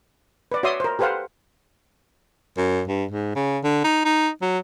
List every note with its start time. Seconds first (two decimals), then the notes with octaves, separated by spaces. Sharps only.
0.52 B4 D5
0.63 F#4 C#5 D5 E5 C6 D#6
0.80 A#4 C5
0.99 G4 A4 B4 C5 F5 F#5
2.57 F#2
2.88 G2
3.11 G#2
3.35 C#3
3.64 D3
3.84 D#4
4.05 D#4
4.42 F#3